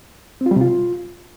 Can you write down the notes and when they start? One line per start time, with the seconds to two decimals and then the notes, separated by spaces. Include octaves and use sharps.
0.41 C4
0.46 F4
0.51 G3
0.56 C3
0.61 F4